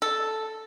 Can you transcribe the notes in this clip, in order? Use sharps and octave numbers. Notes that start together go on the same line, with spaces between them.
A4